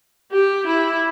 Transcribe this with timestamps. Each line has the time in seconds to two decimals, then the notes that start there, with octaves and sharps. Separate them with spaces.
0.32 G4
0.67 E4